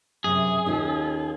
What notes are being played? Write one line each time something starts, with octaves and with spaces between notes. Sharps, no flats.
F#2 C3 G#4
D#2 C#4 D#4 F4